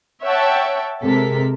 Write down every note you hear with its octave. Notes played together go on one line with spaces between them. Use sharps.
C#5 E5 F#5 G5 A5
C3 G#3 A4 A#4 B6